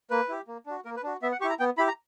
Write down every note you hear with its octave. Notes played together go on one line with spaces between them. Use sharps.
A#3 B4
E4 G4
A#3
D4 F#4
A#3 A#4
B4
D4 F#4
B3 E5
F#5
E4 G4 C#6
A#5
B3 G5
E4 G4 B5
A#5